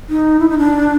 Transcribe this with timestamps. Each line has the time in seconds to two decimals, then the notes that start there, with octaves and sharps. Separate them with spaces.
0.09 D#4
0.40 E4
0.50 D#4
0.58 D4